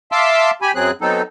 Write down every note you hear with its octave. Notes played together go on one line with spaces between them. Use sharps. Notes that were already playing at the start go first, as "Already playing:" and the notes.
E5 F5 A5 C6 D6 E6
G4 G#5 B5
F#2 F#3 C4 G#4 F#6
F#3 B3 C4 D#4 A4